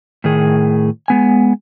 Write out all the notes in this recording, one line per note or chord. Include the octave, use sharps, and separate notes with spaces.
A2 D#3 G#4
G#3 B3 G#5